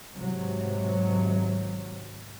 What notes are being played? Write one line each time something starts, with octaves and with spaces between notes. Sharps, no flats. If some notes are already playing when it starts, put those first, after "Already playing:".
G#1 C3 F#3